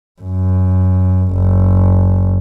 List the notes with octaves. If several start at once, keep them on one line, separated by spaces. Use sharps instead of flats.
F#2
F#1